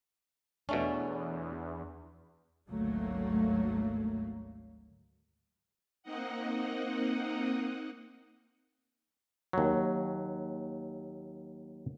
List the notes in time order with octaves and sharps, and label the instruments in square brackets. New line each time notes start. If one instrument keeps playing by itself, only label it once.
[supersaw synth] E2 [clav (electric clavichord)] B2 A3 C#4 [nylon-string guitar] D4
[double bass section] G#1 D2 F#3 A3 A#3
[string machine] A#3 C4 D#4 D#5 F#5
[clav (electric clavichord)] D#2 F#3